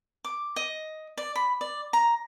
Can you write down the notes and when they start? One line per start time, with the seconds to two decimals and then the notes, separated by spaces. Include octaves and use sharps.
0.25 D6
0.56 D#5
1.18 D5
1.36 B5
1.61 D5
1.93 A#5